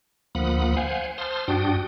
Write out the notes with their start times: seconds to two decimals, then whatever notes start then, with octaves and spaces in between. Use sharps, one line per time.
0.35 D2 F3 A#3 F#5 B5 D#6
0.77 C5 F5 F#5 G#5
1.18 C5 A5 C6 D#6 F6
1.48 G2 D4 F#4 G5 D#6